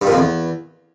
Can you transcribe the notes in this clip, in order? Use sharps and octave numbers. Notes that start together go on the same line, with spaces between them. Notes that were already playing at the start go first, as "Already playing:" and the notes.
G2
A#2
F2
E2